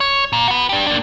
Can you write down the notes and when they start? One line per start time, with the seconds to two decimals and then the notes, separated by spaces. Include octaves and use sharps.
0.01 C#5
0.33 A#2
0.48 F#4 B4
0.69 D4 G4
0.87 A#3 D4